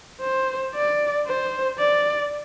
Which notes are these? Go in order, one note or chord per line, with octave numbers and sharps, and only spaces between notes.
C5
D5
C5
D5